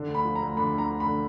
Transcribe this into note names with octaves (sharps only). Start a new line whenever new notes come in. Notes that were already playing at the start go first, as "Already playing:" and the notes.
Already playing: D3
D2
B5
F3
A#5
D2
D3 B5
D2
A#5
D2
B5
D3